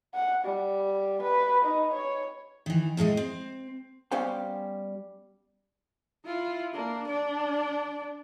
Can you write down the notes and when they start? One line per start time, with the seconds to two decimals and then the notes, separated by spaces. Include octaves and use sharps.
0.14 F#5
0.45 G3
1.22 B4
1.65 D#4
1.94 C#5
2.66 D#3 E3
2.97 F2 A2 G#3 D#5
3.17 C4
4.11 G3 B3 C#4 C5 F5 G5
6.25 E4 F4
6.74 A#3 D4
7.08 D4 D5